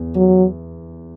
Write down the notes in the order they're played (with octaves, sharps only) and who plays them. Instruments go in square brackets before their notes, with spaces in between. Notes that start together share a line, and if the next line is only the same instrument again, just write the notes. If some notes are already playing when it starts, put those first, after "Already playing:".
Already playing: [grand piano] E2
[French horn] F#3